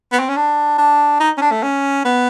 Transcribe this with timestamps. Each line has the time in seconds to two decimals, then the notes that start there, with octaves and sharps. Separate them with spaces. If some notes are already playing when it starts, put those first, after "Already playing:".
0.12 B3
0.20 C4
0.29 C#4
0.36 D4
0.78 D4
1.20 D#4
1.37 C#4
1.42 D4
1.51 A3
1.63 C#4
2.05 B3